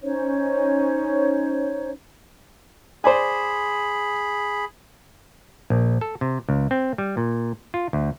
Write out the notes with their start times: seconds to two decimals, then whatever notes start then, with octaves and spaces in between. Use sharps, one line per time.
0.01 C#4 D#4 C5 C#5
3.04 G#4 C5 D5 G#5 B5
5.70 A#1
6.01 A4
6.21 C3
6.49 C#2
6.71 C4
6.98 G3
7.17 A#2
7.74 F4
7.93 D2